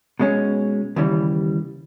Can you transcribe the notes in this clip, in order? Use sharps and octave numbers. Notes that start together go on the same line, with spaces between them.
B2 G#3 C#4
D#2 C#3 E3 G3